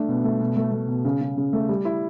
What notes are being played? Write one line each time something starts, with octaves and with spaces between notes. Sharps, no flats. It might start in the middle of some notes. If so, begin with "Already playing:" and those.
Already playing: A3 D4
B2
A3
B2
A3
A3
B2
C#3
C#3
C#3
A3
G3
E4